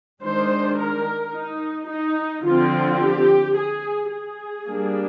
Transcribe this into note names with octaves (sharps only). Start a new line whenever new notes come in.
D#3 G#3 D4 C5
A#4
D#4
D#4
D3 F3 C4 F4
G4
G#4
G#4
G3 A#3 D4